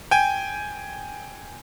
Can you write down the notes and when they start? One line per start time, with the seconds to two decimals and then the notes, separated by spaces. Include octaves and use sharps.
0.11 G5 G#5